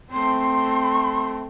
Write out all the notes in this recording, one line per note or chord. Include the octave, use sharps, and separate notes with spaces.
A3 C4 C6